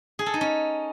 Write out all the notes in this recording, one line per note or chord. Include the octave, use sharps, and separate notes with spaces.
G#4
A4
D#4
C#4